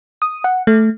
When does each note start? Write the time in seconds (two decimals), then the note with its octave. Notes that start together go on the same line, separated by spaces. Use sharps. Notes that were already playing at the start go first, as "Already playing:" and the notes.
0.22 D#6
0.44 F#5
0.67 A3